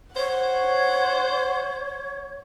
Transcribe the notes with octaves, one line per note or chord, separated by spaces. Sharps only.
C5 C#5 F#5